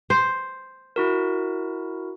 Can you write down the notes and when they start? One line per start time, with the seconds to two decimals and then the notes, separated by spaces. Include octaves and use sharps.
0.10 C5
0.96 E4 F#4 A#4